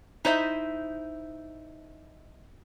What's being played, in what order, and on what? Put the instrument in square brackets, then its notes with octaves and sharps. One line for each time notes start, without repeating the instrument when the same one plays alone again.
[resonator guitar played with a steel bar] D#4 E4 C5 D#5 E5